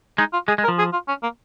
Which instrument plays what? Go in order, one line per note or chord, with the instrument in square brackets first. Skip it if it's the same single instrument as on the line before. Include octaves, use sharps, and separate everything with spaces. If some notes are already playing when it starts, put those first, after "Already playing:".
[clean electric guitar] G#3 [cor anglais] D#4
[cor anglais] F4
[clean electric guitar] G#3 [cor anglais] G#4
[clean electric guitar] G#3
[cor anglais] A#4
[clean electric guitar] F3
[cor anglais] G#4
F4
C#4
A#3